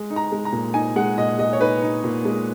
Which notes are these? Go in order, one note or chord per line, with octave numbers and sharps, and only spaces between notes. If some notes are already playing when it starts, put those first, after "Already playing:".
Already playing: G#3
D#4
A#5
G#3
A#5
A#2
D#4 G#5
G#3 F#5
A#2 D#5
G#3 D#5
C#5
D#4 B4
D#4
A#2
G#3